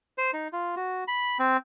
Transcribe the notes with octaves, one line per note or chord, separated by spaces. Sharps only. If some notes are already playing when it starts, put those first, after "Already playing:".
C5
D#4
F4
F#4
B5
C4